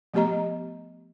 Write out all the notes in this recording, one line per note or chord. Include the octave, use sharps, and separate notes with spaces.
F3 A3 B3 G4 D#5 A#5